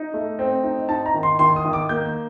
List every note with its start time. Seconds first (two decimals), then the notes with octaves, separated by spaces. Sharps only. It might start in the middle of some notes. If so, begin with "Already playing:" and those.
Already playing: D#4
0.14 A3
0.39 C4
0.64 D#4
0.89 D#4 A5
1.06 A#5
1.14 D#3
1.23 C6
1.39 D#3 C6
1.56 D#6
1.65 D#3
1.73 D6
1.89 A#3 G6